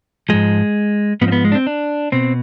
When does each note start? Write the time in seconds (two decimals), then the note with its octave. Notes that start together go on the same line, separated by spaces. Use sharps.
0.29 G#2 F3 G#3
1.21 G#2 F3 B3
1.28 C4
1.32 B3
1.45 G#3
1.52 D4
1.55 C4
1.67 D4
2.12 B2 C4